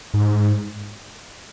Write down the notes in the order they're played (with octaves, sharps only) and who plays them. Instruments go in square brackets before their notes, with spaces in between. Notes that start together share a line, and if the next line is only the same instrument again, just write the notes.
[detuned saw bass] G#2